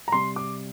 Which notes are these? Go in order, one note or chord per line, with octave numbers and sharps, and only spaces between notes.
A#5
C3 G3 C6
D6